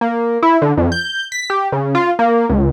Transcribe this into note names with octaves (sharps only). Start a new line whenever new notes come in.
A#3
E4
D3
F2
G6
B6
G4
C#3
F4
A#3
C#2